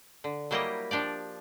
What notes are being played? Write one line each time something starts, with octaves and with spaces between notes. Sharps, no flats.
D3
F#3 G3 A#3 E4 G4 D#5
F3 D4 G4 D5